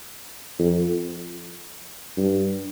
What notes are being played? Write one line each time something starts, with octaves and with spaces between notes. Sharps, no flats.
F2
G2